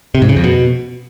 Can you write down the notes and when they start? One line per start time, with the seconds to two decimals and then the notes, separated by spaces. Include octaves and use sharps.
0.15 C3
0.22 G#2
0.29 C#3
0.36 F2
0.44 B2